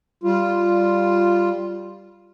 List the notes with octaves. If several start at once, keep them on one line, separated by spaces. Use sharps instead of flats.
G3 F4